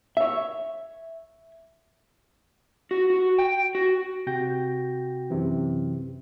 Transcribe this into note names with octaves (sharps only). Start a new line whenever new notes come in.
C#5 E5
F#4
F#4
G5
F#4
C3 F#4 G5 G6 A#6
F#2 C3 E3